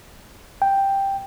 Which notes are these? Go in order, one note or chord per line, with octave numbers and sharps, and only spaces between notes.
G5